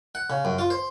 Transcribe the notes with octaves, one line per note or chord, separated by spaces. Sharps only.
F#5
C#3
F#2
F4
C5